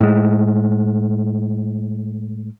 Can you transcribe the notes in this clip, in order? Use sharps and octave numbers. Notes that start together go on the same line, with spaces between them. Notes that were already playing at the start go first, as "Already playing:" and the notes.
A2 G#3